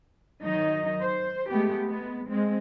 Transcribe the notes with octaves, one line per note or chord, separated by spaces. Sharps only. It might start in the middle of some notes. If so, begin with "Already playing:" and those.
D#3 F#3 D#4 D#5
C5
G#3 A3 B3 G4
G#3 B3
G#3 C4